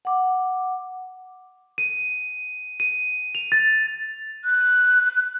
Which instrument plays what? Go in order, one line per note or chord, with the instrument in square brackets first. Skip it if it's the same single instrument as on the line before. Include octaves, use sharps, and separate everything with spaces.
[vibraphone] F#5 D6
[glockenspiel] D#7
D#7
F7
A6
[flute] F#6